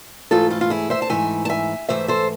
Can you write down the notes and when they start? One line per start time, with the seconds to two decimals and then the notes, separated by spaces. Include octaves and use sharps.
0.31 G#2 E3 A3 F4 A4
0.50 F4 A4
0.61 F4
0.70 E4 G#4
0.90 C5 E5
1.02 A5
1.09 G#2 E3 A3 E5 G#5
1.45 A5
1.50 E5 G#5
1.89 G#2 E3 A3 C5 E5
2.08 A4 C5